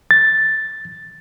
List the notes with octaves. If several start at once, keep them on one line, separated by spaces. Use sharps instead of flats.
A6